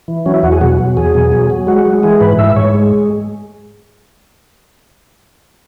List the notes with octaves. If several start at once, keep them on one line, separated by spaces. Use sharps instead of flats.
E3
F#3 C#4
E4
E2 F#4
G#4
B2 F#4
F#3
E2 G#4
B2
F#3
F#3
G#3 F#4
G#3
E3 G#4
G#2 B4
G#2 E5
G#2 C#5
G#3